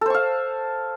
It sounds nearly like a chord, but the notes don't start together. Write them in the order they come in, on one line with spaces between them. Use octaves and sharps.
A4 C5 C#6 F5